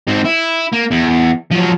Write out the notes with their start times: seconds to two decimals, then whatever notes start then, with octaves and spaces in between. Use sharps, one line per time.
0.08 G#2 C4
0.25 E4
0.72 A#3
0.91 E2
1.51 F3 F#3